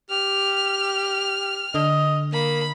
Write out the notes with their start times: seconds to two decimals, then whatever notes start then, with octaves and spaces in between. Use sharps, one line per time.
0.10 G4 F6
1.74 D3 D#5
2.33 A#3 B5